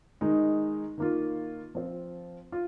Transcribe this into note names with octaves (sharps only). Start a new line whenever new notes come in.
D#3 G#3 D#4
D#3 A#3 F4
F3 C4 F4
F4